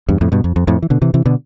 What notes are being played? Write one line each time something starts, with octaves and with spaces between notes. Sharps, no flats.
E2 G2
F2 A2
G2 B2
F2
F2
F2 A2
E3
B2 D3
C3 E3
C3 E3
B2 D3